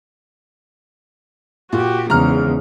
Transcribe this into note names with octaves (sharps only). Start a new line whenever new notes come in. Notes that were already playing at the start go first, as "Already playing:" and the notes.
A#2 F#4 G4
E2 G#2 C#3 A#5 F6